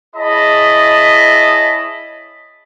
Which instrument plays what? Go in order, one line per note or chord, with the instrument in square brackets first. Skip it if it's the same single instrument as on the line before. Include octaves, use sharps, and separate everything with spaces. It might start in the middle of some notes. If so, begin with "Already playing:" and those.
[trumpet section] E4 G#4 C#5 D#5 A5 B5